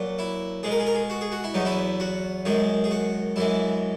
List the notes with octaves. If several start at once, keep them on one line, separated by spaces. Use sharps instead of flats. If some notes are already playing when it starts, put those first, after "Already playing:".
Already playing: A#2 F#3
E4
B2 G#3 G#4
A#4
G#4
A#4
G#4
F#4
G#4
F#4
E4
E2 B2 F#3 D#4
E4
F#4
F#2 D#3 G#3 G#4
G#4
F#4
F#2 E3 G#3 E4